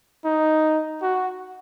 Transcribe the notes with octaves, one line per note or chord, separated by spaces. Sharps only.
D#4
F#4